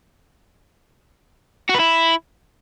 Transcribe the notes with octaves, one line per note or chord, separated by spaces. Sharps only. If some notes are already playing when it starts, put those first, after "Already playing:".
F#4
B4
E4